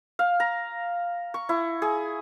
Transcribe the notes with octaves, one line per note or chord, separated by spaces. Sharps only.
F5
A#5
C#6
E4
G#4